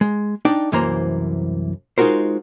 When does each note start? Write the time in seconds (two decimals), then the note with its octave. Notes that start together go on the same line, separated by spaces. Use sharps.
0.01 G#3
0.45 D4 D#4 D5 G5
0.72 C2 F#2 E3 A#3 C5 A#5
1.98 G#3 D#4 F4 F#4 A#4 C5